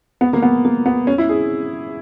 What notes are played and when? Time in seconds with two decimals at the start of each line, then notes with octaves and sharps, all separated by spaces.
0.21 B3
0.33 A#3
0.42 B3
0.65 A#3
0.86 B3
1.07 C#4
1.18 E4
1.29 G#4